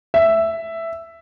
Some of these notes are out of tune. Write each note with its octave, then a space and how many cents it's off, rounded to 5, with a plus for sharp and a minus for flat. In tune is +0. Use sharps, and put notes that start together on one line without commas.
E5 +5